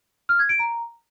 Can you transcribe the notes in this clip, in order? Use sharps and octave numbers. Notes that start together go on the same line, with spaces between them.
F6
G#6
D7
A#5